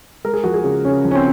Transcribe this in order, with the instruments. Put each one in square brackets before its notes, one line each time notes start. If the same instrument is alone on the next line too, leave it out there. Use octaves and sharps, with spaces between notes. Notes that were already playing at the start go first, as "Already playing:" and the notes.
[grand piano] G#3 A#4
G#4
F3 F#4
G#4
C#3
C#3 C#4
F3
C#4
C4